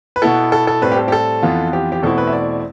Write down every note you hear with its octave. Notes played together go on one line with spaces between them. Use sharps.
B4
B2 B3 E4 A4
A4
A4
A2 G3 C4 B4
G4
A4
G4
A4
F2 E3 B3 F4
G4
G4
E2 B2 A3 C4 E4 A4
B4
E5
D5